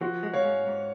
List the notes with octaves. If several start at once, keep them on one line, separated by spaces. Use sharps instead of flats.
F3 F#4
G#3
C#5 F5
G#2
G#2